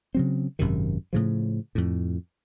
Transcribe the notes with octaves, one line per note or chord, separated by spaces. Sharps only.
C#3 F#3 C4
G#1 F#2 C3 D#3
A2 C#3 F3
F2 A2